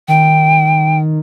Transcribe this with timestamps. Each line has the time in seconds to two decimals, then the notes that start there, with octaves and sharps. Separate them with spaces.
0.08 D#3 G5